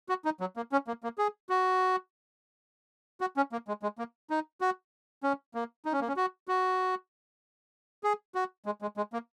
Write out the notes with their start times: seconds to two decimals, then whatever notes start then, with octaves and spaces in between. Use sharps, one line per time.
0.09 F#4
0.25 D#4
0.40 F#3
0.57 A#3
0.72 C#4
0.87 A#3
1.03 A#3
1.18 G#4
1.49 F#4
3.21 F#4
3.37 C#4
3.52 A#3
3.68 G#3
3.83 G#3
3.99 A#3
4.30 D#4
4.61 F#4
5.23 C#4
5.55 A#3
5.85 D#4
5.93 C#4
6.01 A#3
6.08 C#4
6.17 F#4
6.48 F#4
8.04 G#4
8.35 F#4
8.66 G#3
8.82 G#3
8.97 G#3
9.13 A#3